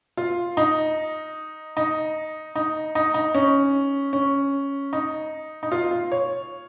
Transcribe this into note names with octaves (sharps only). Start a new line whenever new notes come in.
F4
D#4
D#4
D#4
D#4
D#4
C#4
C#4
D#4
D#4
F4
F4
C#5